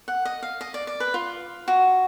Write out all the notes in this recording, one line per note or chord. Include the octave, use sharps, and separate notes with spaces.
F#5
D#5
F5
D#5
D5
D5
B4
F4
F#4